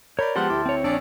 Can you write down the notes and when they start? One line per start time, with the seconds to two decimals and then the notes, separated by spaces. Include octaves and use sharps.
0.19 A#4 C#5 D5 B5 G6
0.36 F3 G#3 B3 G4 F#5 A5 C6 F6
0.50 D2 E4 D6
0.66 C4 C#5
0.84 A#1 D4 G#4 D5 E6